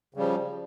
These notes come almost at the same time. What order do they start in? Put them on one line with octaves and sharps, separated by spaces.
C#3 G3 F3